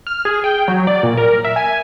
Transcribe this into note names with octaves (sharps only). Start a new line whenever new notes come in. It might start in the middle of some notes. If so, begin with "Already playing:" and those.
F6
G#4
G5
F#3
D5
A#2
A#4
E5
G#5